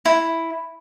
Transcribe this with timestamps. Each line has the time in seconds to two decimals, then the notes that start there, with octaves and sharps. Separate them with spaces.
0.05 E4